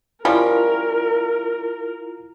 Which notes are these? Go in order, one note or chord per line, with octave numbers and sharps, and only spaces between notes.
F3 G3 C#4 E4 F4 A#4